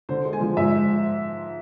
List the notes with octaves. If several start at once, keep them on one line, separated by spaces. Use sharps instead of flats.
D3 C5
G#3
G#5
F3
G#2 E5